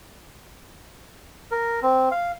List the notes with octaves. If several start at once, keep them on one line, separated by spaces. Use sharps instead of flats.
A#4
C4
F5